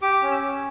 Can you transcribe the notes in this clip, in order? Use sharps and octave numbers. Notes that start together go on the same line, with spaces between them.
G4 D6
C#4
E6
C#4